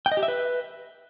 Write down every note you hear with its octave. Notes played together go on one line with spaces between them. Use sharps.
G5
D#5
G4
E5
B4